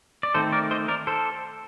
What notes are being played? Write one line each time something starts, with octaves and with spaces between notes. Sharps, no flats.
D5
D#3 A3 C4 A4 C5
A#4 D5
C5 D#5
A#4 D5
A4 C5